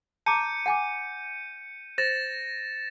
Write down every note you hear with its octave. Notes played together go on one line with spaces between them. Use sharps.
A5 A#5 D6 G6 C#7 D#7
F#5 G#5 D6
C5 A6 A#6 E7